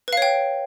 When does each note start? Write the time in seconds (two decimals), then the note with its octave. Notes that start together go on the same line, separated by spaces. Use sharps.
0.08 B4
0.13 F5
0.17 C#5
0.22 G5